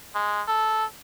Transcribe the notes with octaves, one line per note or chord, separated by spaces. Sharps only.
G#3
A4